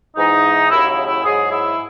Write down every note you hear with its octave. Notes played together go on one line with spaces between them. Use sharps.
G#2 E3 D#4
D#2 C#3 F#3 E4
E4
E4
G#2 F#3 G#4
E4